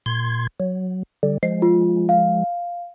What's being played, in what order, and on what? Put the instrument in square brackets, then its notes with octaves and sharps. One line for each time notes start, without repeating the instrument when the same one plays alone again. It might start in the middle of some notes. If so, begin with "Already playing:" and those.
[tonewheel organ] A#2 C6 G#6
F#3
D3 G3
[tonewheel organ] F3 G#3 [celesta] C7
[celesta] F4
F5